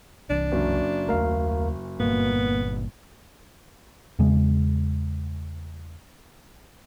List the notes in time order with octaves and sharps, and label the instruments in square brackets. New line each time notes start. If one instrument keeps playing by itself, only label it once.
[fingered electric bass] C2 E3 [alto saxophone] D4
[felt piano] F#1 F#3 C#4
[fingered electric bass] D#2 A3 [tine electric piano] A#4 F5
[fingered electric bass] G1 G2 A#2 [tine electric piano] A#3 [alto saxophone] B3
[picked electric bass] E2 C#3 G#3